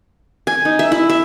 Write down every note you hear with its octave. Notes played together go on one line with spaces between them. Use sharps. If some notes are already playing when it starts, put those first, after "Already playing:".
G#5
D#4
E5
E4
E5